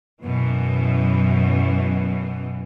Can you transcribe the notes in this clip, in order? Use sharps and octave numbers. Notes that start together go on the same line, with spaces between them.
F#2 B2 E3